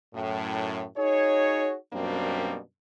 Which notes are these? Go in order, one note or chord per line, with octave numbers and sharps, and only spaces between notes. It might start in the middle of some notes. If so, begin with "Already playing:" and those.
F#2 A2
D#4 F#4 G#4 C#5
F#2 B2 G3 A#3 C4 D4